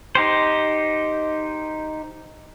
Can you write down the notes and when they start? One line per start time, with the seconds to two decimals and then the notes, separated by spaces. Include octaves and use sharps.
0.15 D#4 G4 C5